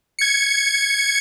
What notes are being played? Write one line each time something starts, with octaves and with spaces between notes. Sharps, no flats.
G#6 C#7